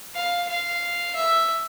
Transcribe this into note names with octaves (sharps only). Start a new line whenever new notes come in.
F5
F5
E5